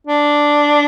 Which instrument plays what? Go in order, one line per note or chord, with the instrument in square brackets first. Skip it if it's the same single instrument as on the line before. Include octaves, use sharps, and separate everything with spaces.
[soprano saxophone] D4